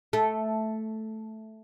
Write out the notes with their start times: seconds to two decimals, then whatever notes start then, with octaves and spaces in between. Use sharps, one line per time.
0.13 A3